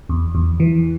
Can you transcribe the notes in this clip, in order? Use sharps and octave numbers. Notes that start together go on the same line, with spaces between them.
E2
E2
E3